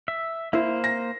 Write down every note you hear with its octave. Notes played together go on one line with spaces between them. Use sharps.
E5
A#3 E4 C5
A#6